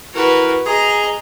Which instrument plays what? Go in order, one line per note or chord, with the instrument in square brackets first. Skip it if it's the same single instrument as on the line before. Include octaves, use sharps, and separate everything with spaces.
[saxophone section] E3 A#4 [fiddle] F#4 B4
[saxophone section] G#4 [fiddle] D#5 A#5